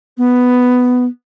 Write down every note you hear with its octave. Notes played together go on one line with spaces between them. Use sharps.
B3